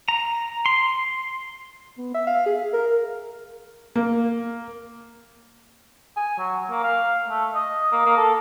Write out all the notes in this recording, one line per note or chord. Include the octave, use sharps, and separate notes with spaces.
A#5
C6
B3
E5
F5
G#4
A#4
A#3
G#5
F#3
A#3
F5
A3
D#5
A#3
A#3
A4